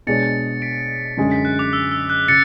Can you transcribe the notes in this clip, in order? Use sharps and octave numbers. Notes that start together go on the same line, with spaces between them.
B2 G#3 D4 G#4 C#5 A6 C#7
B6 D7
F#2 D3 G#3 C#4 G#4
B6
F#6
D6
E6
E6
F#6
C#3 A6 C#7